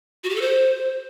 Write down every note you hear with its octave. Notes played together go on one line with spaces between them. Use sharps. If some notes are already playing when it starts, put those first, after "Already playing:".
F#4
G4
A4
C5